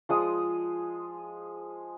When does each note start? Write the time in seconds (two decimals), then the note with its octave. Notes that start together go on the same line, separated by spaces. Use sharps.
0.09 F3 G#3 D#6